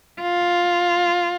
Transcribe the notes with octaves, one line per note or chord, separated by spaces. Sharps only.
F4